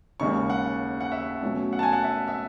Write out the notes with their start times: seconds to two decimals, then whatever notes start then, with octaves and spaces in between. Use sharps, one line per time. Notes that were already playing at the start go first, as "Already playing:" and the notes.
0.20 D#2 C#3 G#3 C#6
0.50 F#5
1.01 F#5
1.12 E5
1.43 B2 F#3 A3 C#4
1.73 F#5
1.79 A5
1.83 G#5
1.93 F#5
2.04 E5
2.28 E5